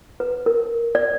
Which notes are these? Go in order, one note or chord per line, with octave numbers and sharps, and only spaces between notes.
B4
A#4
D5